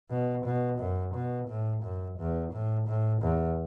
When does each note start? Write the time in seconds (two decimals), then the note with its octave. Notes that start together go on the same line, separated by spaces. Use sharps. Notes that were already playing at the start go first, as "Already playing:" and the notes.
0.10 B2
0.45 B2
0.79 F#2
1.15 B2
1.49 A2
1.83 F#2
2.19 E2
2.53 A2
2.88 A2
3.22 E2